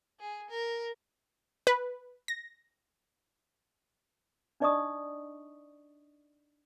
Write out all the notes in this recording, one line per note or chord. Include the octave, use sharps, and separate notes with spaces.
G#4
A#4
B4
A#6
D4 D#4 D5 D#5 C#6 D#6